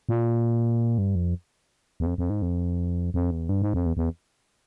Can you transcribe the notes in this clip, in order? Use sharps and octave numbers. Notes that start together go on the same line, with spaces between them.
A#2
G2
F2
E2
F2
F2
G#2
F2
F2
E2
G2
G#2
F2
E2
E2